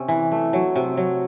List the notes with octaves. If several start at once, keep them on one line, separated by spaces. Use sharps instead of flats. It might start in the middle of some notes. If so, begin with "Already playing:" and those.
Already playing: C3 C#4
E3
A3
F#3
C3
F#3